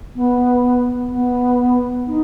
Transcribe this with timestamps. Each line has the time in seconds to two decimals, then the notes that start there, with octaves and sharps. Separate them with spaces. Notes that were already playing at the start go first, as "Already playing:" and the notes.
0.16 B3
1.12 B3
2.08 D#4